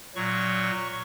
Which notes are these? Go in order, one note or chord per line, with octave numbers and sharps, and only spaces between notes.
A#2 F#3 C#6